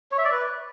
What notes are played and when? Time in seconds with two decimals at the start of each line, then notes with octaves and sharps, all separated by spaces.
0.12 C#5
0.18 E5
0.25 D5
0.31 B4